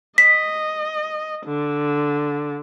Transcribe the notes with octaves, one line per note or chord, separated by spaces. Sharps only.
D#5 B6
D3